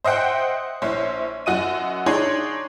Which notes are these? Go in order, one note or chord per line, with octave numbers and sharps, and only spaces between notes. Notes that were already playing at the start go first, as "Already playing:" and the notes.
C5 D#5 E5 F#5 G5
A#1 E4 C5 C#5
F#2 F#4 D#5 D#7
D4 D#4 G#4 C#5 C6